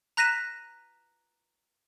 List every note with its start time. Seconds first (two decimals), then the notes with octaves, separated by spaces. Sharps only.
0.17 A#5 F#6 A#6 B6 D#7 E7